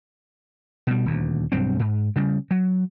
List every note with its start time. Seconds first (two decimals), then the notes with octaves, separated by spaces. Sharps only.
0.87 B2 G3
1.06 D#1 D2
1.52 B1 G2 F#3 C4
1.80 G#2
2.16 C#3 G3
2.51 F#3